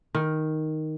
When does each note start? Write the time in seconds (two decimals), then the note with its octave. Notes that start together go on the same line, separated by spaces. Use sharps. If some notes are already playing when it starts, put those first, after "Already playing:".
0.14 D#3